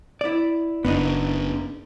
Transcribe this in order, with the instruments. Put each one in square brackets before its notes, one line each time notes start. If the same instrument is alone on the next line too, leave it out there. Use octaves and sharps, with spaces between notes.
[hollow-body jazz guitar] E4 D5
[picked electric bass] F#1 [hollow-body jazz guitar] B3 D4 D#4